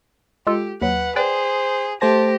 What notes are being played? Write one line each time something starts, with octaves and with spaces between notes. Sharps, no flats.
G#3 F4 G4 A4
D#2 F#3 B4 F#5
G#4 B4 C5 D5 G5
A3 G4 C5 A5 A#6